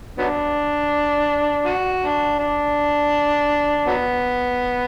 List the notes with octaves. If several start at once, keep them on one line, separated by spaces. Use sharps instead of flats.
F#3 B3 D4
F#4
D4
D4
F#3 B3